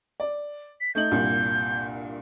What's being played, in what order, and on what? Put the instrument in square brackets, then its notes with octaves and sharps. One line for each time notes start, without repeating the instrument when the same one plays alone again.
[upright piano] D5
[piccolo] B6
[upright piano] A3 D#4 F#7 [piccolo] G6
[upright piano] C2 G2 A#2